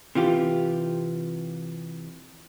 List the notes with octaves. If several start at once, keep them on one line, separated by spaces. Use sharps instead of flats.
C3 E3 F4 G4